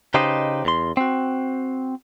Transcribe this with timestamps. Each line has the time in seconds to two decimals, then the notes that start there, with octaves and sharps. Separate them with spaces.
0.14 C#3 D#4 G4 B4 C5 D#5
0.65 E2 C6
0.97 C4 F#4